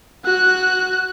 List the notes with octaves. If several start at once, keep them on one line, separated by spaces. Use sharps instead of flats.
F#4 F#6